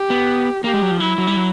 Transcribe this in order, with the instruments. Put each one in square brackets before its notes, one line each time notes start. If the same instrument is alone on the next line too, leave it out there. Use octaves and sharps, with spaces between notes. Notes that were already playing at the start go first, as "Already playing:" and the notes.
Already playing: [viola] G4
[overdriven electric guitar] B3
[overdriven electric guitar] A#3 [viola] G4
[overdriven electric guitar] G#3
F#3
F3
[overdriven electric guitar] F#3 [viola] E4
[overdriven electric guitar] F#3
G3
F#3